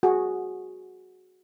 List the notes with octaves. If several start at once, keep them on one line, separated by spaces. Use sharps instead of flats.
F#4 G#4